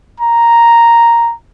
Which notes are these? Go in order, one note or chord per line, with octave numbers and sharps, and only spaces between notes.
A#5